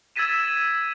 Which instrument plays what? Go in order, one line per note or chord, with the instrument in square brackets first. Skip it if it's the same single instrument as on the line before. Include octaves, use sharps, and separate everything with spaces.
[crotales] E6 G#6 A6 B6 D#7 E7